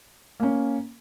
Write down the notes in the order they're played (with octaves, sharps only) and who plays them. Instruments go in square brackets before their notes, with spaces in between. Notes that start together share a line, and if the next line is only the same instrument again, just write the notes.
[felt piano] A#3 C#4